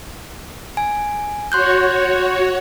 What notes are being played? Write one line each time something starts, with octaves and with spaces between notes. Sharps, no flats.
G#5
F#4 C#5 C6 F#6 G6